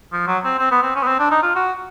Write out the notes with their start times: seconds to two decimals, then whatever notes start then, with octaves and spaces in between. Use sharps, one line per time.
0.13 F3
0.27 F#3
0.44 C4
0.59 C4
0.72 B3
0.83 C4
0.96 C#4
1.03 B3
1.07 C4
1.19 D4
1.31 D#4
1.43 F4
1.55 F#4